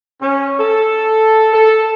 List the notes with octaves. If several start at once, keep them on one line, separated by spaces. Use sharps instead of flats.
C#4
A4
A4